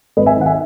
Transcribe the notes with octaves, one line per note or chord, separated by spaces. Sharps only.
G#1 B4 D#5
E5 G#5
D#3 F#5
E5 G#5